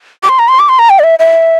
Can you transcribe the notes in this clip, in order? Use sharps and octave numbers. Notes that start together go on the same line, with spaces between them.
D6
C6
A#5
C6
D6
C6
A#5
G5
D5
E5
E5